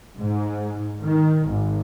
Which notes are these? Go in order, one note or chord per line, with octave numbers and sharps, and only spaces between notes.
G#2
D#3
G#1